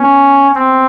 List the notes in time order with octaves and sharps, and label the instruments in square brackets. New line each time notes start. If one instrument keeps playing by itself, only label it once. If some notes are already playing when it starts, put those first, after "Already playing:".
Already playing: [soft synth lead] B3 [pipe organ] C#4
[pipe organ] C4